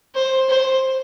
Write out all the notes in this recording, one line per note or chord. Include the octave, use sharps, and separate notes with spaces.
C5
C5